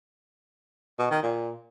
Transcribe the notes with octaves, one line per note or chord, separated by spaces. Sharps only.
B2
D#3
A#2